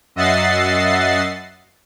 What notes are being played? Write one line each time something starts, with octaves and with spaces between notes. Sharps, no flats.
F#2 D#5 E5 F#5 A6 C7